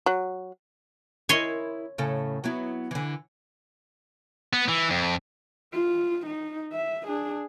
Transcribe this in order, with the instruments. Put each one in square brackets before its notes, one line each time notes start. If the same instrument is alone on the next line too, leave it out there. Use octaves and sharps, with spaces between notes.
[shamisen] F#3
[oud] E4 A#4 D#5 [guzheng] C#5 G#5 C6
[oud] A2 C#3 A4
F#3 B3 E4
D3 E3
[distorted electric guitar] B3
E3
F2
[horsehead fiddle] F4
D#4
E5
D4 G#4